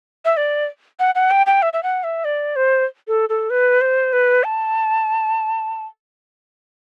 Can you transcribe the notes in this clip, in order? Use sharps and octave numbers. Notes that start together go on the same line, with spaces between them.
E5
D5
F#5
F#5
G5
G5
E5
E5
F#5
E5
D5
C5
A4
A4
B4
C5
B4
A5